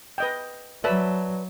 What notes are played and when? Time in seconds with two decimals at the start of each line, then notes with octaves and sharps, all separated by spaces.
0.18 B4 D#5 G5
0.84 F#3 B4 D5 E5 A5